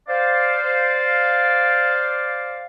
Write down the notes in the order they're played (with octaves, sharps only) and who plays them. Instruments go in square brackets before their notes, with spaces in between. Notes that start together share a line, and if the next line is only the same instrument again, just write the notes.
[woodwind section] C5 D5 F5